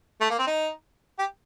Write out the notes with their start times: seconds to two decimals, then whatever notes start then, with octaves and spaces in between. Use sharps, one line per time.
0.21 A3
0.30 A#3
0.39 C4
0.47 D#4
1.19 G4